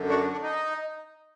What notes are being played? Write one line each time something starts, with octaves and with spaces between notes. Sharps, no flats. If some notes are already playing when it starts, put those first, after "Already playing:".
Already playing: F#2 D3
D4 F#4
D4
D4
D#4